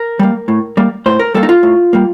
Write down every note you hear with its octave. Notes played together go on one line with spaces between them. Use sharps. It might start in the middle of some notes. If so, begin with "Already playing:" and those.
Already playing: A#4
G3 A#3
A2
G3 A#3
A2 C5
A#4
G3 A#3 A4
D#4
F4
A2
G3 A#3